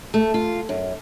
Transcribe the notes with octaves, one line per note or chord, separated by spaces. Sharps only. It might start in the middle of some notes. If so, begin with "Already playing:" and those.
A3
F4
F#2